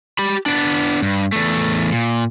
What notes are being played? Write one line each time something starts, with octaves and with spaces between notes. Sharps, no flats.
G4 B5
B3 D4
G2
E2 A3
A#2